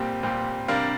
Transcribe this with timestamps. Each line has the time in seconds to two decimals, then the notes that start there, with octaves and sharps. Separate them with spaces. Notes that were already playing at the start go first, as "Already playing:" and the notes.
Already playing: A#2 G3 C4 G4
0.23 A#2 G3 C4 G4
0.68 C3 G3 D4 A#4 F5